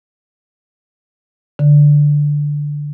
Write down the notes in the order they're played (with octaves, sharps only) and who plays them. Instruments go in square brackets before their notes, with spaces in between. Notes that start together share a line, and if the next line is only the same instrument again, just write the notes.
[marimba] D3